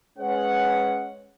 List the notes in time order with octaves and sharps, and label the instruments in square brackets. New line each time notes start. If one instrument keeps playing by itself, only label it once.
[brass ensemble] G#3 C#4 B4 C#5 F#5